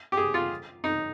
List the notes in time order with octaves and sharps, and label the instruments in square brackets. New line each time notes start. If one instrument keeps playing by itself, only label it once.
[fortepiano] G4
G#4
F4
D#4